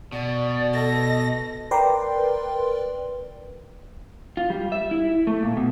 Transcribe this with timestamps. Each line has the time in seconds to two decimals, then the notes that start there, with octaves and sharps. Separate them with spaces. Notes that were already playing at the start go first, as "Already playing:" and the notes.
0.12 B2 D5
0.74 A4 D#5 A#6
1.71 A#4 B4 D5 G5 C6
4.37 F4
4.50 G3
4.72 E5
4.91 E4
5.27 A3
5.43 A#2
5.57 B2